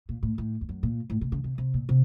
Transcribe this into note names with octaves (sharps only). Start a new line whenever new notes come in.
A#2
A2
A2
F2
F#2
A#2
A2
C3
C#3
C3
C3
A#2
C3